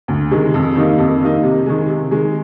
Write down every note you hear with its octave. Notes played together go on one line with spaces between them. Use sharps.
D2
C3 D#3 G#3
F2
D#3 G3 A#3 D#4
F2
D#3 G3 A#3 D#4
C3
D#3 G#3
C3
D#3 G#3